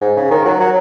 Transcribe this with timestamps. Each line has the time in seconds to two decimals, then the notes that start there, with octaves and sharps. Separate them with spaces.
0.01 G#2
0.16 C#3
0.31 D#3
0.45 F#3
0.60 F#3